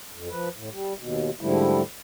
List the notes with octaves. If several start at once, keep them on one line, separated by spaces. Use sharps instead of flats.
F2
F3 B4
A2
G3
D#2 B2
G#2 D3 F3 G3 A3 E4